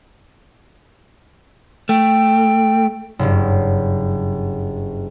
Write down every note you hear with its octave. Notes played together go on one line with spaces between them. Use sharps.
A3 G5
F#1 G2